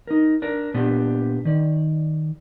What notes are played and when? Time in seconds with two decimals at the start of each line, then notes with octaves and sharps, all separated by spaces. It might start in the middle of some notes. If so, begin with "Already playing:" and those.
0.07 D#4 A#4
0.42 D4 A#4
0.74 A#2 B3 D4 G4
1.45 D#3 D5